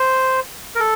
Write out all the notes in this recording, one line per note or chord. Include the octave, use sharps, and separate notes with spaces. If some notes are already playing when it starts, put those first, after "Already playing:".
Already playing: C5
A#4
A4